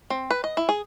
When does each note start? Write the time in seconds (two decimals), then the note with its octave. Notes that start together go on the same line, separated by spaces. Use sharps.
0.10 C4
0.31 B4
0.44 D#5
0.57 E4
0.69 G#4